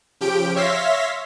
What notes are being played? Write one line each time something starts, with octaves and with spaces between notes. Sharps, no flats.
C#3 F3 G4 G5 D7
C#5 E5 F5 C6 A#6 B6